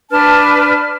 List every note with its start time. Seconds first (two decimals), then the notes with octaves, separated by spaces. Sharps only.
0.10 D4 B4 A5 F6